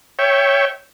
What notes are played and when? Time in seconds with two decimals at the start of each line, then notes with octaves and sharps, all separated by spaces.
0.19 C#5 E5 G5